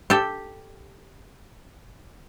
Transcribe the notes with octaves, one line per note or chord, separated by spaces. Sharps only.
G4 A4